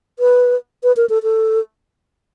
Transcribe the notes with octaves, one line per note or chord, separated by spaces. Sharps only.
B4
B4
A#4
A4
A4